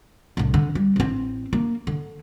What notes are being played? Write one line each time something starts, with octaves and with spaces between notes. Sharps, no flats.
C2 A2
D3
G3
A1 C4
A#3
D3